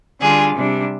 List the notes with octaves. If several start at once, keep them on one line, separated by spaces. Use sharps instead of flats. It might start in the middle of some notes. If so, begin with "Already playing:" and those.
D3 G3 D4 F4 G#4
C3 G3 D4